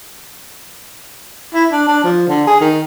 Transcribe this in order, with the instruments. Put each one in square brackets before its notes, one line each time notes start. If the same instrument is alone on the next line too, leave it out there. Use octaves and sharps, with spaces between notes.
[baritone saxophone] E4
D4
D4
F3
D3
G#4
D#3